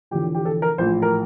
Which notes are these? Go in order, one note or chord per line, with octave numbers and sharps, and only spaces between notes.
E1 E2 D3 F3 G4
G4
A4
A#4
A#1 A2 E3 C5
A#4